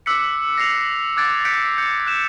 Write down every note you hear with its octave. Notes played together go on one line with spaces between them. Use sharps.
D6 E6 F#6 B6 C#7
A#6 C7 F7
D6 E6 F#6 G#6 A6 D7
F#6 G6 B6 C#7 D7
G6 C#7
F#6 E7